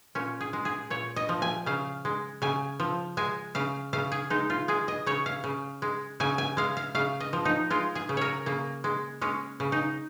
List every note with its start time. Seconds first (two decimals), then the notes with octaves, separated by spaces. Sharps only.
0.15 A#2 C#4
0.41 G#4
0.53 G#3
0.65 G#4
0.90 A#2 C#5
1.16 D#5
1.29 F3
1.42 G#5
1.66 C#3 F5
2.05 G#3
2.42 C#3 G#5
2.80 F3
3.17 G#3 G#5
3.55 C#3 F5
3.93 C#3 F5
4.12 G#4
4.30 G#3 D#4
4.50 F4
4.68 G#3 G#4
4.88 D#5
5.06 C#3 C#5
5.26 F5
5.44 C#3
5.82 G#3
6.20 C#3 G#5
6.38 G#5
6.57 G#3 F5
6.77 F5
6.95 C#3 F5
7.20 D#5
7.33 F3
7.45 D#4
7.70 G#3 F4
7.95 G#4
8.09 C#3
8.17 A#4 C#5
8.46 C#3 A#3
8.84 G#3
9.21 G#3 C#4
9.60 C#3
9.72 D#4